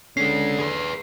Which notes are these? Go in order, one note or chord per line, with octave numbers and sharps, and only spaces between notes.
D3 G#3 C#4 C7
G#4 B4